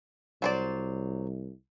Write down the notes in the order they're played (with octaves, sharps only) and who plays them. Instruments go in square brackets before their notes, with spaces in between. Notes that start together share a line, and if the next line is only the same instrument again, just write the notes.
[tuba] C2 [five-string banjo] F#3 C5 D5